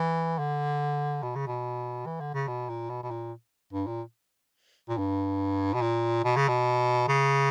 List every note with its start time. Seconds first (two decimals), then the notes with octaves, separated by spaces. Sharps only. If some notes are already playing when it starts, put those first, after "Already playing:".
Already playing: E3
0.39 D3
1.23 B2
1.36 C#3
1.47 B2
2.06 E3
2.20 D3
2.34 C#3
2.48 B2
2.69 A#2
2.90 B2
3.03 B2
3.11 A#2
3.73 G2
3.87 A#2
4.89 A#2
4.98 G2
5.74 B2
5.82 A#2
6.24 B2
6.37 C#3
6.49 B2
7.08 C#3